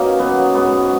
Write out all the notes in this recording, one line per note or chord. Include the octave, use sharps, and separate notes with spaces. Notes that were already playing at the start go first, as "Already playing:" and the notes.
Already playing: B2 A#3 C#4 D#4
F#3 B3
G#2 B3